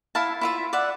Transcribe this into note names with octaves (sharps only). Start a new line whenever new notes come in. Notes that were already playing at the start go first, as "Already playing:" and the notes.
E4 E5 F5 A5
E4 F4 E5
D5 E5 F#5